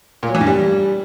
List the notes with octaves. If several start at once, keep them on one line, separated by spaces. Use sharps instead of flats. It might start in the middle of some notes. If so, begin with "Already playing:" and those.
A#2
F#3
E3
G2
G3